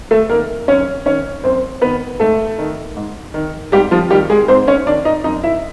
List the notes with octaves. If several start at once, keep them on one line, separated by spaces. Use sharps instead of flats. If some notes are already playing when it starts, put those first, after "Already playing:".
A3 A4
D#3 A#3 A#4
F#2 C#4 C#5
D#3 C#4 C#5
F#2 C4 C5
D#3 B3 B4
G#2 A3 A4
D#3
G#2
D#3
G#2 G3 G4
F3 F4
D#3 G3 G4
G#3 G#4
G#2 C4 C5
C#4 C#5
D#3 D4 D5
D#4 D#5
F#2 D#4 D#5
E4 E5